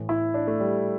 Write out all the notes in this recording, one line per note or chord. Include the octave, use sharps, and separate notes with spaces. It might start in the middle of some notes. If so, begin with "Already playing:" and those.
Already playing: A2 E3
E4
D4
A3
G3